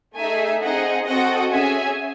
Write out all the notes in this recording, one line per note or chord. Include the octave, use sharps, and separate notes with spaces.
A3 D#4 G#4 E5 G#5
C4 D#4 G#4 D#5 F#5
C4 F#4 A4 D#5 F#5
C#4 G#4 E5 G#5